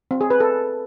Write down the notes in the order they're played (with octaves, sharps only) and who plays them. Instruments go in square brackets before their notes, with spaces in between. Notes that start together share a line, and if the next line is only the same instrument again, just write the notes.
[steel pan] C4
G#4
B4
A4